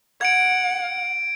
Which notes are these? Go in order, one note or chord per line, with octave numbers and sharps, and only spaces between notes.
F#5 G#6 D7